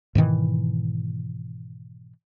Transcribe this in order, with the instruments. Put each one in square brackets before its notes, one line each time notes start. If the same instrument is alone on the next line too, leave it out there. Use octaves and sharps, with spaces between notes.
[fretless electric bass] G#2 B2 D#3 E3